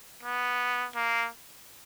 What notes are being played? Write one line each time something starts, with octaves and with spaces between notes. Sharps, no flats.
B3
A#3